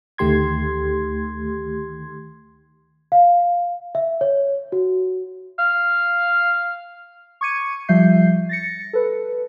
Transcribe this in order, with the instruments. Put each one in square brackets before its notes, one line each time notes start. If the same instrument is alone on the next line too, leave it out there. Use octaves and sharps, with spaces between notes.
[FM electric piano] D2 D#3 A3 G4 C6 G#6
[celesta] F5
E5
C#5
F#4
[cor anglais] F5
[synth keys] C#6 D6 G#6 C#7 D#7
F3 G3 E5 G6 C7
A6 A#6 C#7
A4 B4